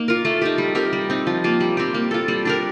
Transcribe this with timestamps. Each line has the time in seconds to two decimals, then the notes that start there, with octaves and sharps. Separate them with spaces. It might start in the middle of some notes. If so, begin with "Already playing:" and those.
Already playing: A#3 D#4
0.08 F4 A#4
0.25 A3
0.42 D#4 G4
0.58 G3
0.75 C4 G4 A#4
0.93 G3
1.10 C4 D#4
1.27 F3
1.44 A#3 F4
1.60 G3
1.77 C4 G4
1.94 A#3
2.11 F4 A4
2.28 G3
2.45 D4 G4 A#4